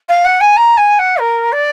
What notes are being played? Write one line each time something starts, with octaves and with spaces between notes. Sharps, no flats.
F5
F#5
G#5
A#5
G#5
F#5
A#4
D5